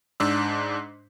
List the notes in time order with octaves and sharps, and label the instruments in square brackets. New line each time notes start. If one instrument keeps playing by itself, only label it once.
[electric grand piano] G#2 D4 E6